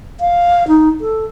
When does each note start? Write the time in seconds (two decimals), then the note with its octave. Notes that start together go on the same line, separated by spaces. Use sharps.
0.20 F5
0.68 D#4
1.01 A4